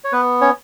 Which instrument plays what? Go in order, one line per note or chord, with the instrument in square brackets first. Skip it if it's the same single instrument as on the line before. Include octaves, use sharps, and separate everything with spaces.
[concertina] C#5
B3 B4
C#4 C#5